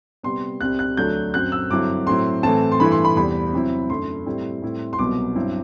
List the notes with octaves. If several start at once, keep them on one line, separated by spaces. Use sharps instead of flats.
C3 G3 B3 C6
C2 C3 G3 C4 F#6
F#6
D2 D3 F#3 A3 D4 G6
F#2 F#3 C4 F#6
E6
G2 D3 F#3 C4 E4 D6
A2 F#3 C4 E4 C6
A2 E3 A3 C4 A5
C6
G2 E3 A3 E4 B5
C6
B5
E2 C3 G3 C4 B5
C3 F#3 C4 E4
F#2 D3 A3 C6
A2 G3 C4 E4
A2 G3 C4 E4
C6
C2 B2 F#3 B3 D6
G2 F#3 C4 E4